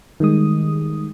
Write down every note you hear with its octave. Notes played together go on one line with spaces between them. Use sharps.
D#3 G3 G#3 D#6